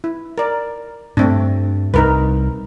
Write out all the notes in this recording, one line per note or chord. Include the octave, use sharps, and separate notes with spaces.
E4
A#4 D5
G2 A3 C4 D4
C2 D#4 A#4 B4